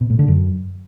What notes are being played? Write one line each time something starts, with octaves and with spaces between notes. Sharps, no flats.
B2
A2
D3
F#2